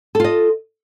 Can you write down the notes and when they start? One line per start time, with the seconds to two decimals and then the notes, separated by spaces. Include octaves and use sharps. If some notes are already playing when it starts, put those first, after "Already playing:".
0.15 A4
0.20 F4
0.24 D#5